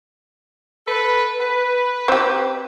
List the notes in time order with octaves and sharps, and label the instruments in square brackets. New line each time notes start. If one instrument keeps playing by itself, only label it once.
[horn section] A4 B4
B4
[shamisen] C4 G4